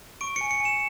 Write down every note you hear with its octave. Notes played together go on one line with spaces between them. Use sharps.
C#6 D7
G#5 C#7
C#7
G#5 E7